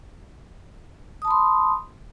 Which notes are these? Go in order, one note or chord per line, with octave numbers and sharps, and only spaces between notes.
A5 B5 C6 D#6